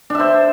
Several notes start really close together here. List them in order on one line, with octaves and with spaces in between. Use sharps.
D4 E5 C5